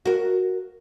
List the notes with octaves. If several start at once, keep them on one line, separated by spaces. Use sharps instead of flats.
F#4 A#4